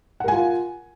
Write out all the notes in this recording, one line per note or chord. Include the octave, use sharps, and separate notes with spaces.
F4 A#4 F#5 G#5